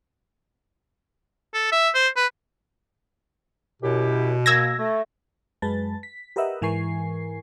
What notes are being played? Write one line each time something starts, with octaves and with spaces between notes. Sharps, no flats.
A4
E5
C5
B4
F#2 B2 E4 G4
A#3 E6 G#6 A#6
A3
F#2 G#3 B4 A5 A6
B6
G4 A#4 B4 D#5 E5 F#5
G#2 E3 A#4 G#5 C#6 C7